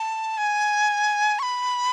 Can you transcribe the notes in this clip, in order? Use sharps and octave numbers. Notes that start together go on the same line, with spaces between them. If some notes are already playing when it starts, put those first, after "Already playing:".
Already playing: A5
G#5
C#6
B5